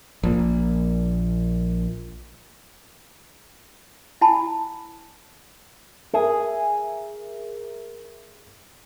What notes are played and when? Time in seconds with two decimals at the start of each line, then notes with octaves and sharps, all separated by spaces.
0.23 A#1 A#2
4.21 E4 F#5 G#5 A5 B5
6.14 G#4 A#4 E5